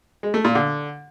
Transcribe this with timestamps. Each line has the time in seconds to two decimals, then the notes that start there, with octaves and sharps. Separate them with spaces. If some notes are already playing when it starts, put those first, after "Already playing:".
0.23 G#3
0.34 A3
0.45 A#2
0.55 D3